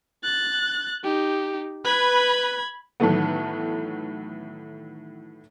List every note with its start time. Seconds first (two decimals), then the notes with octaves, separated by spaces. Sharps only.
0.23 F#6 A6
1.04 D#4 G4
1.85 B4 B5 G#6
3.00 A2 D#3 E3 F#3 A3 B3